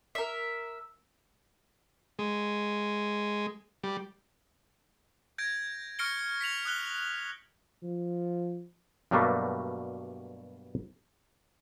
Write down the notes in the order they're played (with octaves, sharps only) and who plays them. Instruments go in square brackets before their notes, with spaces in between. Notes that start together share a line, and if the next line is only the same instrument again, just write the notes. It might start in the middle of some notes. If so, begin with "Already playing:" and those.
[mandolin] A#4 E5
[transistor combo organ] G#3
G3
[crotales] G6 G#6 A#6 D7
C#6 F6 A#6 C#7 D7 G7
B6 C#7 F7 F#7
D#6 F#6 G7
[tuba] F3
[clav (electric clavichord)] G2 B2 F#3 G3 A3 A#3